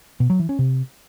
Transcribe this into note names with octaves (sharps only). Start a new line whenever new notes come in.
B2
F#3
E3
C#4
C3